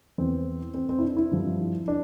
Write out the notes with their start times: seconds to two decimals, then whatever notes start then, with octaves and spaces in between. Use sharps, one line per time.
0.18 E2 E3 C4
0.74 C4
0.89 C4
0.99 E4
1.02 D4
1.17 E4
1.31 G2 F3
1.88 D4